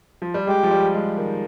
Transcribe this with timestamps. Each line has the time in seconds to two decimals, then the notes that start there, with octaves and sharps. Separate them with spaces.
0.22 F3
0.34 G3
0.47 G#3 G4
0.63 F3
0.71 G3
0.94 G#3
1.17 D#3